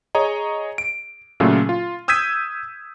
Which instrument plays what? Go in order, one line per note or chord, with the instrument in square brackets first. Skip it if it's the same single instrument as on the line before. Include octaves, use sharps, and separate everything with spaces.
[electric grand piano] G#4 C#5 D#5 A#5
D7
A#2 C#3 F#3 A3 C#4 F4
F4
D#6 E6 G6 G#6 B6 D#7